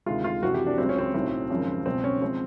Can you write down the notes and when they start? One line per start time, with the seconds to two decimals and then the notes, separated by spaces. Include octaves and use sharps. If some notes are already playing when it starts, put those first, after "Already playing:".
0.06 D2 C3 D#3 G#3 F4
0.24 F4
0.43 F#1 F2 C3 E3 F#4
0.54 G4
0.67 D4
0.78 C#2 C#3 F#3 C4
0.89 C#4
0.99 C4
1.14 B1 A2 F#3
1.50 G#1 F#2 C#3 F3
1.86 C#2 B2 F#3 C4
2.04 C#4
2.22 F3 G#3 C4